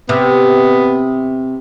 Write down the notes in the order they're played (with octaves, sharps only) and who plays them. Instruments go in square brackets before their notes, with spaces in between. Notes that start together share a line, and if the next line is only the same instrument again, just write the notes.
[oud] C3 [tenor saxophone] B3